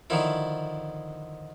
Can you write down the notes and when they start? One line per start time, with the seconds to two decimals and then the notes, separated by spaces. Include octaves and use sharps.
0.10 D3 D#3 F3 E4